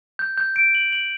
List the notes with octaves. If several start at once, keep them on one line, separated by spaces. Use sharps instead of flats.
G6
G6
D7
F#7
F#7